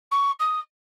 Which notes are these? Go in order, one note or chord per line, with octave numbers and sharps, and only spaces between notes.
C#6
D#6